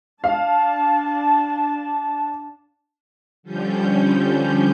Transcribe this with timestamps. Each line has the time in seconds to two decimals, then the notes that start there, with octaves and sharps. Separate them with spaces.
0.24 D4 F5 A5
3.43 D3 F3 G3 C#4 G6